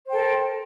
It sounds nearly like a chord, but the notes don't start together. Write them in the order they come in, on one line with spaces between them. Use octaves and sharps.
C5 G5 A4 A#4